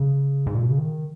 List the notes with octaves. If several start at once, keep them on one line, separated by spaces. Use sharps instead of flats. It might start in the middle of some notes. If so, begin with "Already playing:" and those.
Already playing: C#3
G#2
A#2
B2
C#3
D#3